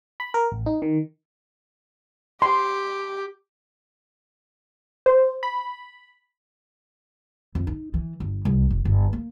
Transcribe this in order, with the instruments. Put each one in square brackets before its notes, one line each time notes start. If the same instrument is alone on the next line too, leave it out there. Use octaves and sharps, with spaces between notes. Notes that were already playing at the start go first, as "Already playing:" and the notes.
[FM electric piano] B5
A#4
A1
D#4
D#3
[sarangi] G4 [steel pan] C6
[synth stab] C5
B5
[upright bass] F2
D#4
E3
G1
C2
F1
G1
A#3